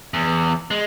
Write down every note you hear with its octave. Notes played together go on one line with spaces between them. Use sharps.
E2
G#3